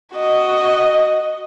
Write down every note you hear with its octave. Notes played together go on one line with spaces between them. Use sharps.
F#4 D#5